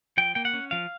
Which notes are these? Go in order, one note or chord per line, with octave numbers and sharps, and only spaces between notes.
F3 G5
A#3 G5
F#5
C#4
F3 F5